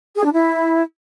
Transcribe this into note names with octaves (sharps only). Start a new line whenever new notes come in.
G#4
D4
E4